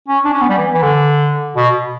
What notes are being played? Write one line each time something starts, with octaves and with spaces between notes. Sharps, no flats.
C#4
D4
C#4
B3
G3
E3
E3
D3
B2